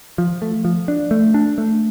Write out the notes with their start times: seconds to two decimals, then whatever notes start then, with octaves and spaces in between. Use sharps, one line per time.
0.18 F3
0.42 A3
0.65 F3
0.88 D4
1.11 A3
1.34 D4
1.58 A3